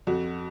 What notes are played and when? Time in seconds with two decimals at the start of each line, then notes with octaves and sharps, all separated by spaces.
0.07 F2 F#4